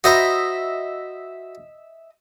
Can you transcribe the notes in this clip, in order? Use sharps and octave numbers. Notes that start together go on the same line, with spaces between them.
F#4 C5 D#5 E5 A#5 B5